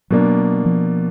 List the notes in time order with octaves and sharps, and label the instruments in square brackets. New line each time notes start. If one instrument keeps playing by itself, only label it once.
[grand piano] B2 A#3 D4 [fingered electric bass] F#3
[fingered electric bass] F3